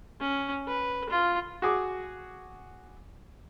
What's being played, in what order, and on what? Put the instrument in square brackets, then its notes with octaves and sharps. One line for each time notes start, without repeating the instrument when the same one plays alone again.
[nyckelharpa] C#4
B4
F4
[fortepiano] F#4 G#4 D6